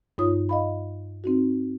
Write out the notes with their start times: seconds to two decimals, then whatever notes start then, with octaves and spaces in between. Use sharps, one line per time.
0.18 G2 D#4 F4 C#5 D#6
0.49 D#5 F5 B5
1.24 C4 D#4 F#4